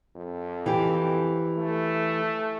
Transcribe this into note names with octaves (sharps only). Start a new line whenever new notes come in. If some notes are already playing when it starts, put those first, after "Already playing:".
F2
E3 G4
A3